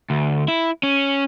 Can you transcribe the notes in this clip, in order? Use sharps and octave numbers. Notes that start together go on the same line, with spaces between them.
D2
E4
C#4